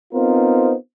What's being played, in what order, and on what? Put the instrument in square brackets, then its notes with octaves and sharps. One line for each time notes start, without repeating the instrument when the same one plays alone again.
[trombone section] B3 C4 D#4 F4 A#4 C5